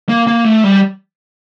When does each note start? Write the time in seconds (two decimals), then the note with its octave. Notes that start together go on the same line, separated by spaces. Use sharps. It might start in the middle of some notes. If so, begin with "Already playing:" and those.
0.09 A#3
0.27 A#3
0.44 A3
0.64 G3